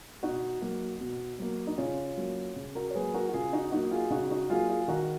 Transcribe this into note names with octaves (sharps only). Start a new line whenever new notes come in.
B2 D#4 F#4
F#3 A#3
B2
F#3 A#3
D#4
C#3 C#4 F4
F#3 A#3
C#3
F#4 A#4
C#5
F#3 A#3 G#4 B4
F#4 A#4
F#4
C#3 F4 G#4
D#4 F#4
F#3 A#3 D#4 F#4
F4 G#4
C#3 D#4 F#4
D#4 F#4
F#3 A#3 F4 G#4
F4 G#4
G#4
D#3 F#4 A#4